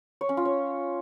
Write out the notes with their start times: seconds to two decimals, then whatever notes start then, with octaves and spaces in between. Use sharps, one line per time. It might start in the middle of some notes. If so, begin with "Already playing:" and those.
0.21 C#5
0.29 C#4
0.37 F4
0.45 C#5